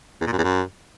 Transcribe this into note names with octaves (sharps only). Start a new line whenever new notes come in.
E2
A#2
F#2
E2
F#2